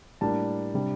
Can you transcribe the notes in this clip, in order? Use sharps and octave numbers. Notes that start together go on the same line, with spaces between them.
A2 G3 A#3 D4 A5
C3 G3 D4